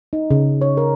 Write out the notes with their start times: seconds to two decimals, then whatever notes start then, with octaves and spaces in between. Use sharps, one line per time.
0.13 D#4
0.31 C#3
0.61 C#5
0.77 A#4